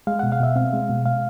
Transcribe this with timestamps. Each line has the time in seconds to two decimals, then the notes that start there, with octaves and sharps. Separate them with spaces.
0.07 G#3 F5
0.19 B2 F#5
0.32 F5
0.40 B2 E5
0.56 C4 F5
0.73 G#3
0.89 B2
1.05 G#3 F5